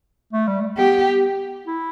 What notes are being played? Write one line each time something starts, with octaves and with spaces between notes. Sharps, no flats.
A3
G3
A3
B3 G4
E4